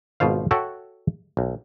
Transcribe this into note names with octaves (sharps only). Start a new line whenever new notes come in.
G#1 B2 F4 C5 F5
F#4 A4 C#5 E5 F#5 G5
B1